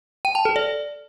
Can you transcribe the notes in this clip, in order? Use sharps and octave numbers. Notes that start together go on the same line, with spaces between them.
G5
A5
A4
D5